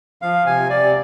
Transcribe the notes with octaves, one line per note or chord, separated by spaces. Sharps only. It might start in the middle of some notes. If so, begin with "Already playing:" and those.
F3 F5
C3 G#5
C3 D5